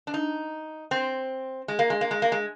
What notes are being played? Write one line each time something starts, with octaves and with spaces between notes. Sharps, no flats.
D4
D#4
C4
G#3
A#3
G#3
A#3
G#3
A#3
G#3